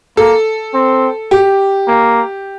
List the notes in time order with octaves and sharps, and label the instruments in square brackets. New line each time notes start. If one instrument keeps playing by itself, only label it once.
[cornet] A#3 [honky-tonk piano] A4
[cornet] C4
[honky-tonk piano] G4
[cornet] A#3